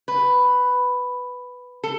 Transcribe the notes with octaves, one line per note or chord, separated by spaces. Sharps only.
B4
A4